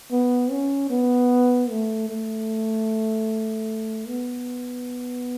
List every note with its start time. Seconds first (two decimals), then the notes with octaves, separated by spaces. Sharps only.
0.11 B3
0.51 C#4
0.90 B3
1.70 A3
2.09 A3
4.07 B3